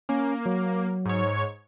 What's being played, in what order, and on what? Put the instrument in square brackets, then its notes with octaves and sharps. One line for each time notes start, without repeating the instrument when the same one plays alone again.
[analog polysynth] A#3 [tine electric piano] C#4
[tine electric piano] F#3
[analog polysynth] G#2 C#5